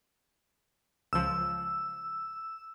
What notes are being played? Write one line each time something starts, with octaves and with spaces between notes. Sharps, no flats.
C#2 F3 E6